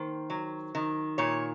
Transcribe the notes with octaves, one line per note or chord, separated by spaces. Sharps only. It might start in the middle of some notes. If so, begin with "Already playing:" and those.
Already playing: D#3 A#3 C5
F#3
D#3
A#2 C#5